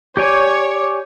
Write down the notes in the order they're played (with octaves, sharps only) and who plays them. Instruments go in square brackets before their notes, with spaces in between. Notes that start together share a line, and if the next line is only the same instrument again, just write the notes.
[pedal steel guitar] G4 D5 G#5 [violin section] C#5